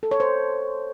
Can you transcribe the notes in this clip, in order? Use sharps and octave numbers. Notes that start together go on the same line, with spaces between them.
A4
C#5
C5